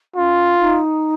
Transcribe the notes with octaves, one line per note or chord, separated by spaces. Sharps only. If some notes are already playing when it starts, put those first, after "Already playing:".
C#4 F4
D#4